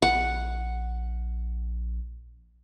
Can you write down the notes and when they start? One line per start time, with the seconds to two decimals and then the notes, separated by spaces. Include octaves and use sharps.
0.02 A#1 F#5